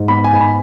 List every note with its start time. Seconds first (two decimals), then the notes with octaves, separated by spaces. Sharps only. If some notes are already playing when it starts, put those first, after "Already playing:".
Already playing: G#2
0.08 B3 B5
0.24 G#5
0.33 G#2
0.40 B5